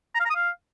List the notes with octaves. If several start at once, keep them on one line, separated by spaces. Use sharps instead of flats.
A#5
F5
A#5
D#6
F5